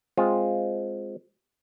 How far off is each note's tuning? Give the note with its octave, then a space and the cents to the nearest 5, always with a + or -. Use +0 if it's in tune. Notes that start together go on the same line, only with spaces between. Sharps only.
G#3 +0 C4 +0 F4 +0